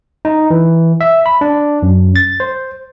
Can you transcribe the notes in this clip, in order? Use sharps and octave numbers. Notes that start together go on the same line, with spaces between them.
D#4
E3
E5
B5
D4
F#2
A6
C5